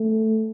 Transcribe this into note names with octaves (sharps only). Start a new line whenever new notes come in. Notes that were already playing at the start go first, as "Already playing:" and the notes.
Already playing: A3